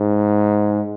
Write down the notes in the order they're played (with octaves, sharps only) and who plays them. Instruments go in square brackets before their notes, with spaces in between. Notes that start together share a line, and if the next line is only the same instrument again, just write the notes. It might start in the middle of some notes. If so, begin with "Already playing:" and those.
Already playing: [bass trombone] G#2